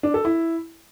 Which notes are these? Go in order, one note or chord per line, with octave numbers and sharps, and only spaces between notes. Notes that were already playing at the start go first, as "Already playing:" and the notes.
D4
A4
E4